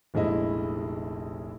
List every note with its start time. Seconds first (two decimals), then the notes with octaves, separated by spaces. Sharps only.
0.14 F1 A#1 G#3 E4 D#5